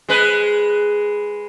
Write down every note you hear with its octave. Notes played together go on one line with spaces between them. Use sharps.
G#3 B4